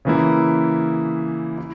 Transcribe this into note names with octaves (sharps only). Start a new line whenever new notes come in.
C#3 E3 A#3 E4
E4